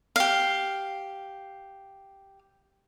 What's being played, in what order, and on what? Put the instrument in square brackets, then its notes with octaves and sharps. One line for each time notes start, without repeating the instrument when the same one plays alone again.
[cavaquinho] G4 F5